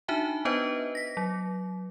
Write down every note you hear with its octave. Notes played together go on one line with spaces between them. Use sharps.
D4 D#4 F#4 E5 G#5 A5
B3 D4 B4 C5 D#5
A#6 B6
F#3